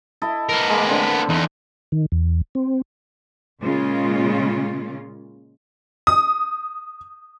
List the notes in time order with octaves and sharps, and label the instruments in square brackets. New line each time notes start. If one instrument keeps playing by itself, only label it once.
[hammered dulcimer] E4 A4 D#5
[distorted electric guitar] B3 A#4
[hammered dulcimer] G#3 A#3
D3 C4
[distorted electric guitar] E2 [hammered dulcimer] D#4
[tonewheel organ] D#3
E2
C4
[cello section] A#2 C#3 G#3 A#3 C#4 F4
[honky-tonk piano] D#6